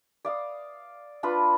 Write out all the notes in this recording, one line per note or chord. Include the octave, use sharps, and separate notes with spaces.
D5 F5 D#6
D4 F4 B4 B5